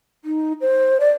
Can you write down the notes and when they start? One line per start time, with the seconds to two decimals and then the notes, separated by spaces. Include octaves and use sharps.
0.25 D#4
0.61 C5
1.00 D5